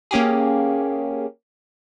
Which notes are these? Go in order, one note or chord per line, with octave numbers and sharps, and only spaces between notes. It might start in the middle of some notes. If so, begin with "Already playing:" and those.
A#3 C#4 G4 G#4